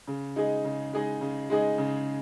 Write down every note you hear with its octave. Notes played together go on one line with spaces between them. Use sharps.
C#3
G#3 D#4 G#4 D#5
C#3
G#3 D#4 G#4 D#5
C#3
G#3 D#4 G#4 D#5
C#3